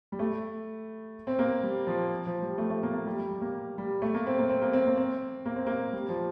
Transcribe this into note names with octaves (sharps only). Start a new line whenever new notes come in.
G3
A3
C4
A#3
G3
F3
F3
G3
A3
A3
A#3
A#3
G3
G3
G3
A#3
G3
A3
A#3
C4
A#3
C4
A#3
C4
A#3
C4
A#3
C4
A#3
G3
F3